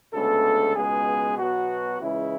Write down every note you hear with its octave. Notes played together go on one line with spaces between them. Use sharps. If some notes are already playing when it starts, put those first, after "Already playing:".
D2 C#3 G#3 B3 A4
C#2 B2 G#3 B3 G#4
B2 F#3 B3 F#4
C#2 C#3 E3 G#3 E4